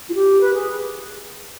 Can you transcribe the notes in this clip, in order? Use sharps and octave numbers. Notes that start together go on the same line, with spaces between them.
F4
G4
B4
G#4